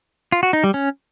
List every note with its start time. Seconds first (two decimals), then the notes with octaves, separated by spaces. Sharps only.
0.32 F4
0.43 F#4
0.53 D#4
0.64 G3
0.74 C#4